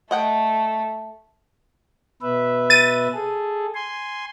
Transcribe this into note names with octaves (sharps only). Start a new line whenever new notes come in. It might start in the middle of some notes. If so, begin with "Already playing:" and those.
A3 D#5 F#5 G5
B2 B4 E5
A6 D#7
G#4 A4
G#5 C6